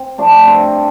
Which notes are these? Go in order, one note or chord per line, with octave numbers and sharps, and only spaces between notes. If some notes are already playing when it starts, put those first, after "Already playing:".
Already playing: C4
F3 A3 D4
G2 C4